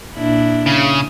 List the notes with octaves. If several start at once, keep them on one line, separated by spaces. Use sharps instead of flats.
A#2 D4 E4
C#3